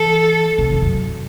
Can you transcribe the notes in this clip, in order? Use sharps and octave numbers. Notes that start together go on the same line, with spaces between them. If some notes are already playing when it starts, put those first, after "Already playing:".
Already playing: E3 A4
C3
E2
F#2